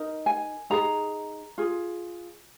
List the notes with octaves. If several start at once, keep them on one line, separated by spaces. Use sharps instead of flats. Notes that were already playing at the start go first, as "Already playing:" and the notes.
Already playing: D#4 A#4
G#5
D#4 G#4 A#5
F4 G#4